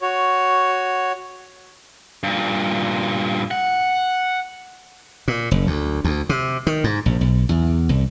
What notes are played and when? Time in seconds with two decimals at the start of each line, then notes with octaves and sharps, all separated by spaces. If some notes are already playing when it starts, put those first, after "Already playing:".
0.01 F#4 C#5
2.23 G2 A#2
3.51 F#5
5.28 A#2
5.51 F#1
5.67 D2
6.05 D2
6.29 C3
6.67 D#3
6.84 G#2
7.06 A#1
7.21 B1
7.49 E2
7.89 C2